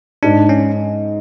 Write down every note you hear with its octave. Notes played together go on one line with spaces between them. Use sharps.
G#2 D4
C#4